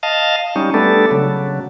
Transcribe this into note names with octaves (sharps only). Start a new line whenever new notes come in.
D#5 F5 A5
G3 C#4 D#4
G3 A3 B3 D4 A4
C#3 F#3